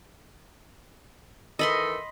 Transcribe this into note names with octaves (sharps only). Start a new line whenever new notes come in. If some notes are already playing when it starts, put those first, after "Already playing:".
D#3 E3 A4 D#5 B5 C6